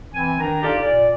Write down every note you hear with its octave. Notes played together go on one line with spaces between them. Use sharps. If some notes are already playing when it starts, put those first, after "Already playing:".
E3 C4 G#5
D#3 D4 A#5
D4 D#4 F4 G4 A4 D5
A#2 D5